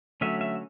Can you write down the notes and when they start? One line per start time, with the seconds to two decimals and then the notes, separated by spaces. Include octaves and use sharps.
0.21 D3 F#3 A3 C#4 E5
0.41 E5